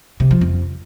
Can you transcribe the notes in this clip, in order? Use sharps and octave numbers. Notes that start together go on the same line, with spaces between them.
C3
F3
F2